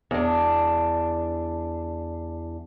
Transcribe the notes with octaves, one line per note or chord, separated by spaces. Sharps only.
E2 D4